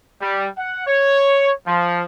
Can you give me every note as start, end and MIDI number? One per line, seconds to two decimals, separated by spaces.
0.21 0.47 55
0.58 0.84 78
0.87 1.53 73
1.67 2.02 53